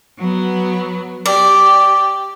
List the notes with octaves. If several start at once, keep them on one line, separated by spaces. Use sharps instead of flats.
F#3 B3
G4 D5